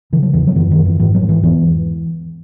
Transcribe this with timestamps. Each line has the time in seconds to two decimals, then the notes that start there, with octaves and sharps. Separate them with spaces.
0.13 C#3 E3
0.23 F#3
0.33 E2 E3
0.47 F#3
0.56 F#2 E3
0.71 D#3
0.78 F#2
0.85 E3
1.00 G#2 E3
1.15 F#3
1.22 G#2
1.29 E3
1.43 E2 E3